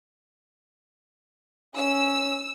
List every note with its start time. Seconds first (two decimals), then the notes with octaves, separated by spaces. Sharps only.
1.77 C#4 E6